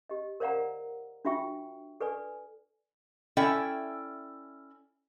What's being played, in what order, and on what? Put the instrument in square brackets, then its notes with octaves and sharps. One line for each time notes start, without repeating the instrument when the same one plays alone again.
[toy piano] G4 D#5
A#4 C5 D5 F5 F#5 A#5
D4 F4 F#4 E5 G5 C#6
A4 B4 D5 G#5
[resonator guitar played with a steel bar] C#4 E4 A4 D5 E5 G5